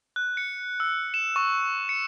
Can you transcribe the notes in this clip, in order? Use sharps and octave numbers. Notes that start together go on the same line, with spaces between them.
F#6
C#7
E6
E7
C#6
C#7